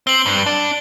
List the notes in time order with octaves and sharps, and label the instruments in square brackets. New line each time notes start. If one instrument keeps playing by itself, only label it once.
[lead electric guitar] C4 [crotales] F#7 G7
[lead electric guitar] G2
D4